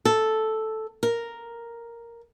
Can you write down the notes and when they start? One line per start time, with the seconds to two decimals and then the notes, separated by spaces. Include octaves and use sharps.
0.05 A4
1.03 A#4